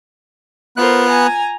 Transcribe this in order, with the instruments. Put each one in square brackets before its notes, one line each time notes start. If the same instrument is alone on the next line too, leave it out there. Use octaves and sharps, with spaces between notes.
[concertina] B3 F#6 [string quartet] F4 A#4 C5
[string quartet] G#5 A#5